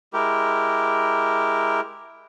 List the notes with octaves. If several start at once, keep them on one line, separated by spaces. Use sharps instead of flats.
G#3 E4 G4 A#4